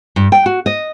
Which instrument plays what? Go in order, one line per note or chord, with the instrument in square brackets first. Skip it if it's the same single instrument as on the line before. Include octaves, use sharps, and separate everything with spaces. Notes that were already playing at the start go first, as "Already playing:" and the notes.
[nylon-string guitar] G2
G5
F#4
D#5